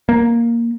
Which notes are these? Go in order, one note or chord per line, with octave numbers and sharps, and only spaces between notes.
A#3